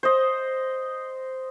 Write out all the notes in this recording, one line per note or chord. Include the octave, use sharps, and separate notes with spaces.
C5 D#5